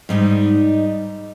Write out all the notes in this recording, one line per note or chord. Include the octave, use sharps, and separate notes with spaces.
G#2 G3 D#4 D#5